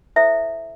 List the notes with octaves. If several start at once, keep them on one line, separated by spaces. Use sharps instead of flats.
E4 A4 C5 E5